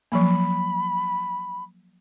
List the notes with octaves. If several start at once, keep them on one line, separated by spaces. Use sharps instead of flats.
F3 F#3 A#3 B5